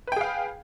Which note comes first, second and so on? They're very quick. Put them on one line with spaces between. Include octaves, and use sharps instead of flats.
B4 G5 G#4 F5